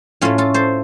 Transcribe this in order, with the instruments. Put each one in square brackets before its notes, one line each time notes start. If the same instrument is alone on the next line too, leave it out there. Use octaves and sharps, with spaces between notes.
[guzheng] A2 A3 C#4 F4
F4 A4
A4 C5